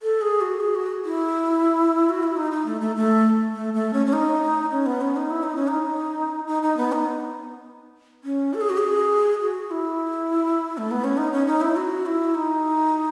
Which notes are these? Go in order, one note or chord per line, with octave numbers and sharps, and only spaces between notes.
A4
G#4
F#4
G#4
F#4
E4
F#4
E4
D#4
D#4
A3
A3
A3
A3
A3
C#4
C#4
D#4
C#4
B3
C#4
D#4
E4
D#4
C#4
D#4
D#4
D#4
B3
D#4
C#4
A4
G#4
F#4
G#4
F#4
E4
A3
B3
C#4
D#4
C#4
D#4
E4
F#4
E4
D#4